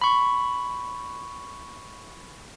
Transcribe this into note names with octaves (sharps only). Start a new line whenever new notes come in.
B5 C#6